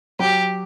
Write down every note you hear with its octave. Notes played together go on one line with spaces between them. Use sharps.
F#3 G4